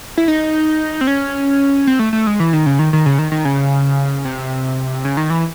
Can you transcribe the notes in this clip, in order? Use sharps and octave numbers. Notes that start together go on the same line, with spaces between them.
E4
D#4
C4
C#4
C4
A3
A3
G#3
E3
D#3
C#3
D#3
D#3
C#3
D#3
D#3
C#3
C3
C#3
D#3
E3